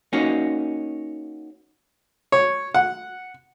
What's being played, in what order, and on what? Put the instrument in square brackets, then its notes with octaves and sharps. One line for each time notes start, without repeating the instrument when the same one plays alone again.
[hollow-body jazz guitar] A#3 C#4 D#4 F#4
[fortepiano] C#5
F#5